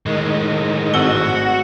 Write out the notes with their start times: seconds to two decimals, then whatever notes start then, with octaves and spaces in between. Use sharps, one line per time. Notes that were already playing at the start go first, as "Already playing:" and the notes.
0.06 A2 D#3 G#3 D#5
0.94 G#1 F#4 E6 G7